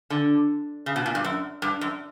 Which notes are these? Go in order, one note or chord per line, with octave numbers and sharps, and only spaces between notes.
D3
C#3
B2
A#2
G2
F#2
G2
F#2